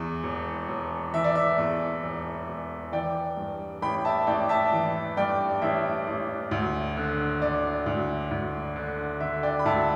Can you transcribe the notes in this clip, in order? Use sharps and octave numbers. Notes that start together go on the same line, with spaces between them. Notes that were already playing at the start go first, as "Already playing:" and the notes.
Already playing: E2 E3
E1
E1
E3 E5
D5
E5
E2
E1
E1
E3 D5 G5
G2
A1 G5 B5
E5 A5
A1 D5 G5
E5 A5
E3
G2 D5 G5
A1 E5
A1
D2
D3
D3 D5
D2
D2
D3
D3 E5
D5 G5
B5
D2 E5 A5